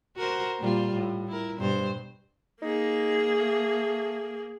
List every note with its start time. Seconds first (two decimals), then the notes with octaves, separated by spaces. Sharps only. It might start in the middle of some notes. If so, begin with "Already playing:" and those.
0.17 F#4 A#4 C5
0.60 A#2 G3 F4
0.94 A2
1.28 E4 A#4
1.59 G2 B2 C5
2.62 A#3 D#4 G#4
3.40 A3